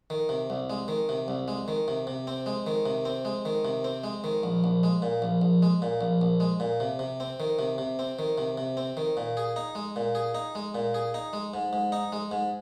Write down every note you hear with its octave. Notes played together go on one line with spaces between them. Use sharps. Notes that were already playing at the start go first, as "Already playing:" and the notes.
D#3
C3
C2
G#3
D#3
C3
C2
G#3
D#3
C3
C3
C4
G#3
D#3
C3
C4
G#3
D#3
C3
C4
G#3
D#3
A#1
A#1
G#3
A#2
A#1
A#1
G#3
A#2
A#1
A#1
G#3
A#2
C3
C3
C4
D#3
C3
C3
C4
D#3
C3
C3
C4
D#3
A#2
G#4
D#4
G#3
A#2
G#4
D#4
G#3
A#2
G#4
D#4
G#3
G#2
G#2
D#4
G#3
G#2